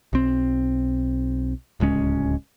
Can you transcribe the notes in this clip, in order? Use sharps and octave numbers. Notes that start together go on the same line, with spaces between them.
B1 C4
D1 C#2 G#3 C#4